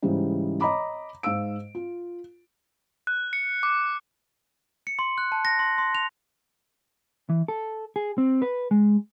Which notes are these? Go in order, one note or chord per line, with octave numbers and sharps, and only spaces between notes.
G#2 C#3 E3 G3 D#4
C#5 D#5 A#5 B5 D6
G#2 F5 E6 D7
F4
F#6
C#7
D6
C#7
C6
F#6
A5
A#6
C6
C6
F7
E3
A4
G#4
C4
B4
G#3